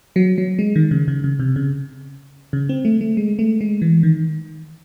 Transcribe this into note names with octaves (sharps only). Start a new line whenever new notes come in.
F#3
F#3
G#3
D#3
C#3
C#3
C#3
C3
C#3
C#3
C4
A3
A3
G#3
A3
G#3
E3
D#3